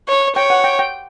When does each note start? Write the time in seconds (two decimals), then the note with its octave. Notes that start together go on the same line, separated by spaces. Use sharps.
0.08 C#5
0.36 C#5 G5
0.50 F#5
0.64 G5
0.79 G5